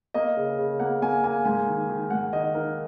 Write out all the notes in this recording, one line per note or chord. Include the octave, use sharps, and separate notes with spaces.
A#3 D#5
C#3
C#3
A#3 F#5
A#3 G#5
A#3 G#5
G#2 G#5
D#3
D#3
G#2 F#5
D#3 D#5
D#3 A#4